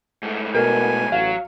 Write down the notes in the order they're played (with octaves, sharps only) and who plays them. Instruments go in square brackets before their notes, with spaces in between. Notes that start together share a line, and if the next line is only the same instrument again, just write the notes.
[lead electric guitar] G#2 A3
[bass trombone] B2 [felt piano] A#4 [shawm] G#5
[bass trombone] A1 [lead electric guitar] F#3 [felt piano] F5